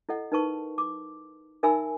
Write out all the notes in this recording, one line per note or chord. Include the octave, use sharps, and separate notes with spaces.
E4 A4 D#5 F#5
D#4 A#4 B4 A5 C#6
D6
D#4 A#4 E5 G#5 B5 E6